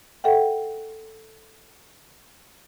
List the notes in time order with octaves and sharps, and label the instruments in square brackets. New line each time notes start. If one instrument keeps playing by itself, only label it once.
[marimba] A4 E5 F#5 G5